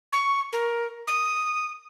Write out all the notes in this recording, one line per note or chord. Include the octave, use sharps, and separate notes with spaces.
C#6
A#4
D#6